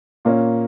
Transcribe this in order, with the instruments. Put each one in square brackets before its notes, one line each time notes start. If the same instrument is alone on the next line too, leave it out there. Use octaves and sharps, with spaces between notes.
[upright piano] A#2 A#3 C#4